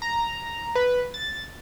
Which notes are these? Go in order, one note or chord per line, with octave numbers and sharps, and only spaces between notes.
A#5
B4
A6